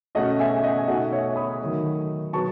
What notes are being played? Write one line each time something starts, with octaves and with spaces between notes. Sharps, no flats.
B2 A3 C#4 D#5 F#5
E5 G#5
D#5 F#5
G#5
B2 A3 D#4 D#5 F#5
C#5 E5
B5 D#6
D#3 F#3 A3 D#4
B2 F#3 B3 A5 C#6